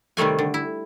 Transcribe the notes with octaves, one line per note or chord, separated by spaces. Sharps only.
C3 D#3 G3 A3 G#5
D3
E4